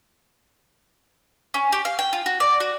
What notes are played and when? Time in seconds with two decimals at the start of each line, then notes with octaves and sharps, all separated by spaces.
1.54 C#4
1.72 G4
1.85 F5
1.99 G5
2.13 F4
2.26 F#4
2.40 D5
2.60 F#4